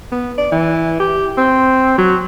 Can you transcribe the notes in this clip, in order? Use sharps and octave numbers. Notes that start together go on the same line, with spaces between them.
B3
D5
E3
G4
C4
F#3